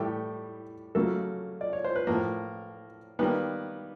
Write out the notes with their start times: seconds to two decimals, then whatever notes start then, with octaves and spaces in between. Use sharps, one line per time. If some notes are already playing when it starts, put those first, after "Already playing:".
Already playing: A2 E3 G3 A3 G4
0.95 C#3 F#3 A3 A#3 A4
1.61 D5
1.73 C#5
1.84 C5
1.96 B4
2.07 A2 F3 A#3 A#4
3.19 D#3 G3 A#3 B3 B4